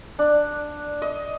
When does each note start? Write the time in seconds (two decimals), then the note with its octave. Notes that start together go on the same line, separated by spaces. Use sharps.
0.19 D4
1.02 D#5